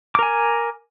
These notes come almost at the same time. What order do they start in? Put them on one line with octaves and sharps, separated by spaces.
D6 A#4 G#5